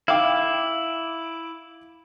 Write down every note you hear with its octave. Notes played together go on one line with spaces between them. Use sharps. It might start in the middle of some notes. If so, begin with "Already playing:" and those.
E4 F5 G5 D6